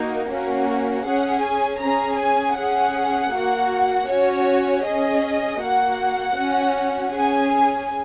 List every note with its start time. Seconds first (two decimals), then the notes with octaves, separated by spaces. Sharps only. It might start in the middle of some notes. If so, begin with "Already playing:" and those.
Already playing: A#3 D#4 F#4
0.29 A#3 C#4 F#4
1.05 C#4 G#4 F#5
1.43 G#5
1.81 C#4 G#4 A#5
2.20 G#5
2.57 C#4 G#4 F#5
3.33 A#3 F#4
4.08 C#4 F#4 C#5
4.85 C#4 G#4 D#5
5.61 A#3 F#4 F#5
6.37 C#4 F#4
7.13 C#4 G#4 G#5